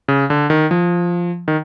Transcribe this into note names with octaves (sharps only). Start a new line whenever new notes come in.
C#3
D3
D#3
F3
D#3